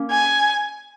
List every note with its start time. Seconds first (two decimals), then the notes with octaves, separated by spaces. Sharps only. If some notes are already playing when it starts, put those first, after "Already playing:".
Already playing: A#3 C#4
0.11 G#5